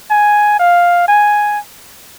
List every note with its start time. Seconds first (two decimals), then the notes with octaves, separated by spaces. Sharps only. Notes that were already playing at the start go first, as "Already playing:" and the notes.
0.11 G#5
0.60 F5
1.09 G#5